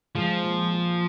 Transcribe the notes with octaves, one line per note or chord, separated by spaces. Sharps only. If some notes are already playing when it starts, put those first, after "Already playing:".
F3 G#3
A#2
F4